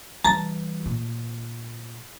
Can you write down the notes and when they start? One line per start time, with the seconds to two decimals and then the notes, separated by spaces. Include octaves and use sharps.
0.24 E3 G3 A5 A#5 A6
0.86 A#2